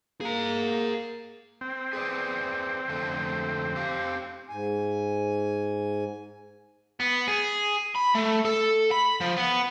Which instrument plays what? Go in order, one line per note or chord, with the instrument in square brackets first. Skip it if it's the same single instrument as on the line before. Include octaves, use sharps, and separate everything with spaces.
[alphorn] A#3 [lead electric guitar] G#4 A#5
[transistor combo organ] C4
[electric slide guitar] G#4 B4 D5
F2 D3 A3
G4 F5
[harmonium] G#2 G#5
[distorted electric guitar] B3
G#4
B5
A3
A4
B5
F3
B3